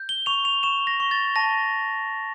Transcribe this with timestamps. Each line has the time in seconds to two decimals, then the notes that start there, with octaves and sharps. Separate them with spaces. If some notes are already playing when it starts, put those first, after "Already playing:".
Already playing: G6
0.09 G7
0.26 C#6 F7
0.45 F7
0.63 C#6 E7
0.87 A#6
1.00 C#6
1.11 A6
1.36 A5 A#6